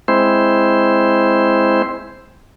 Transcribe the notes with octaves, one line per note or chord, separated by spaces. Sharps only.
G#3 C4 E4 C5